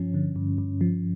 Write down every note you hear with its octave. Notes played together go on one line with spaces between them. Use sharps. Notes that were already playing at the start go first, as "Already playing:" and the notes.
Already playing: G2 F3 C#4
D3
G2
G2
F3